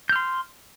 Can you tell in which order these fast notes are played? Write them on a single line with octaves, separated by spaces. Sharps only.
G6 F6 C6